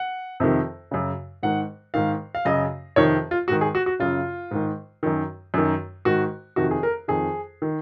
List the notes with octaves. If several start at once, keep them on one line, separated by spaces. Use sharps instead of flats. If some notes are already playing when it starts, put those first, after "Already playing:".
Already playing: F#5
F2 C3 D#3
F#2 C#3
G#2 D#3 F#5
G#2 D#3 F5
F5
F#2 C#3 D#5
F2 C3 D#3 C#5
F4
G#2 D#3 F#4
G#4
F#4
F#4
F#2 C#3 F4
G#2 D#3
F#2 D#3
F#2 D#3
G#2 D#3 F#4
F2 C3 D#3 F#4
G#4
A#4
F2 D#3 G#4
D#3